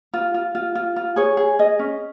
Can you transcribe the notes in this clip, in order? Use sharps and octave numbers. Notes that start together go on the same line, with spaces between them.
F4
F4
F4
F4
F4
G#4 C#5
G#4
G#4 D#5
C#4